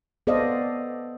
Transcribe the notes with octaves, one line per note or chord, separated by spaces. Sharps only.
B3 A4 C5 D5 D#5 F5